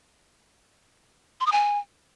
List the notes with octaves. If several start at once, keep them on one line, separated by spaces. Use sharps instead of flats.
C6
D#6
G#5